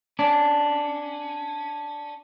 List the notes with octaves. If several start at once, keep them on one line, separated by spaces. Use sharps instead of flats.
C#4 D4